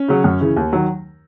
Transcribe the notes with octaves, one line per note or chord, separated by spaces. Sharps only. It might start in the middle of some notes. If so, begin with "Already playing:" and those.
Already playing: C#4
C#3 F#3
F#2
C#3 E3
D#2
D#3 F#3